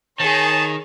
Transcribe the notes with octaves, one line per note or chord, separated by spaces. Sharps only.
D#3 G#4 C#5 A5